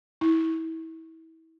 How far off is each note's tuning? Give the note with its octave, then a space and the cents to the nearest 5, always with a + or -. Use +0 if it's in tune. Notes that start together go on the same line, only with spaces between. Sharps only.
E4 -30